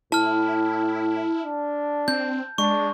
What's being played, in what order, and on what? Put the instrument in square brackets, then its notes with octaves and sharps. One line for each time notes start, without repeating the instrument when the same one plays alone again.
[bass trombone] A2 [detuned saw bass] E4 [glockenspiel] A5 F6
[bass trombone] D4
[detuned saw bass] C4 [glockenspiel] G6
[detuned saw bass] G#3 [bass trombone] D4 [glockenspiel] C#6